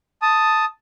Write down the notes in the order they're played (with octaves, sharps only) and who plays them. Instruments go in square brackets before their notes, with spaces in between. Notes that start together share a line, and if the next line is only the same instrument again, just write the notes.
[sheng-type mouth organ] A5 D#6